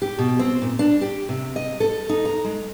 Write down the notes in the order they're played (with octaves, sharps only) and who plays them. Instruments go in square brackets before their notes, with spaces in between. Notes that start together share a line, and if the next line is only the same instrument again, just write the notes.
[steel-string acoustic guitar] G4
B2
C4
A#2
D4
G4
C3
D#5
A4
D#4
A#5
G#3